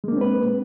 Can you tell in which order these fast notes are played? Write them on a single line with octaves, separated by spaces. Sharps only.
G#3 A#3 D4 C4 B4